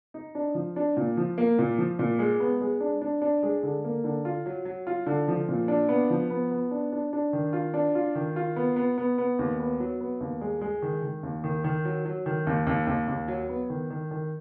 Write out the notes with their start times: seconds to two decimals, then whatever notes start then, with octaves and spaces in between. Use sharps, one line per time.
0.14 D#4
0.35 D4
0.55 F3
0.76 D4
0.97 A#2
1.17 F3
1.38 A#3
1.58 A#2
1.78 F3
1.99 A#2
2.19 G#3
2.40 B3
2.61 G#3
2.80 D4
3.02 D4
3.22 D4
3.43 G#3
3.63 D3
3.84 A#3
4.04 D3
4.25 F4
4.46 F#3
4.65 F#3
4.87 F4
5.06 D3
5.28 F3
5.49 A#2
5.68 D4
5.89 B3
6.10 F3
6.30 B3
6.51 B3
6.71 D4
6.92 D4
7.13 D4
7.33 D#3
7.53 F4
7.74 D4
7.95 F4
8.15 D#3
8.36 F4
8.56 B3
8.76 B3
8.98 B3
9.18 B3
9.39 D#2
9.59 B3
9.80 F#3
10.01 B3
10.21 D#2
10.41 G#3
10.61 G#3
10.82 D#3
11.02 D#3
11.23 D#2
11.44 D#3
11.64 D#3
11.85 F#3
12.05 F#3
12.26 D#3
12.47 D#2
12.67 D#2
12.87 D#2
13.08 D#2
13.28 F#3
13.49 B3
13.70 D#3
13.90 D#3
14.11 D#3